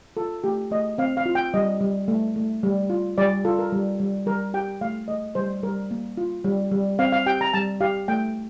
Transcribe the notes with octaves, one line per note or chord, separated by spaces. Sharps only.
F4 A4
A3 G4
A3 D#5
C4 F5
F5
F4
G5
G3 D#5
G3
A3
A3
G3
F4
G3 D5
F4 A4
A#4
G3
G3
G3 A#4
G4 G5
A3 F5
A3 D#5
G3 C5
G3 A#4
A#3
F4
G3
G3
C4 F5
F5
G4 G5
A#5
G3 A5
G4 F5
A3 G5